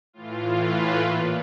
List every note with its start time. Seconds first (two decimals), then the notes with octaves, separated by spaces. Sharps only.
0.13 A2 E3 F4
0.56 B4
0.98 A#2